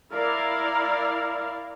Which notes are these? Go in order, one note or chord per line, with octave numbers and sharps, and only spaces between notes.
E4 A#4 D5 F5